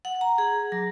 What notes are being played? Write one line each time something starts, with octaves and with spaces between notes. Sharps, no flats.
F#5
A#5
G#4
F#3